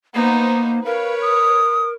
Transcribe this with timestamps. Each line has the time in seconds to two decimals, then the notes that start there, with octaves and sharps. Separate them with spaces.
0.14 A#3 B3 D#4 C5
0.86 A#4 B4 C#5 F5
1.22 D#6